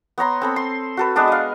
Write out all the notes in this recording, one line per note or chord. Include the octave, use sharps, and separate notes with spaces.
B3 C#5 A#5 C6
C4 A4 B5
C6
F#4 A4 B4
G#3 B3 D4 F#4
D#5 F5